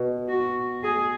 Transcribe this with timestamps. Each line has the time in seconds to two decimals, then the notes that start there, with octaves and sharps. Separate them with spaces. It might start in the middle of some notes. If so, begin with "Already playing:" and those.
Already playing: B2
0.28 F#4
0.83 G#4